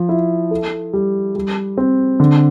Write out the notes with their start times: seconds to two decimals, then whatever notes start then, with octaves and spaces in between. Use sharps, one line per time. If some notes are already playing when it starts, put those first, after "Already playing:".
Already playing: F3
0.09 E4
0.51 A4
0.93 G3
1.36 G3
1.77 C4
2.20 D3